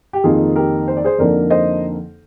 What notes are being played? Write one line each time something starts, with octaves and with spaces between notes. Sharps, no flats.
G4
F2 D#3 A#3 D#4 F4 G#4
G4 A#4
C5
D5
G#4 C5
F2 D3 F3 A#3 D#4 A#4 D5
C5 D#5